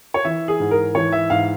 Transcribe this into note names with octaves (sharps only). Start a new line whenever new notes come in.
C#5
E3 E5
G#4
G#2
A#4
E3 C#5
E5
G#2 F5